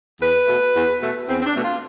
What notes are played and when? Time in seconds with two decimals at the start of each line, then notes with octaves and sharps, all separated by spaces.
0.20 E2 B4
0.47 B2 A3
0.74 E2
1.01 B2 A3
1.28 E2 C4
1.41 C4
1.46 D4
1.55 B2 A3
1.64 F4